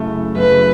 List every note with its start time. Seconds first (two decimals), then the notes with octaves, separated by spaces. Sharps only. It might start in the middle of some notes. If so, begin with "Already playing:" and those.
Already playing: F#2 C#3 A3 E4
0.35 F#2 C#3 A3 E4 B4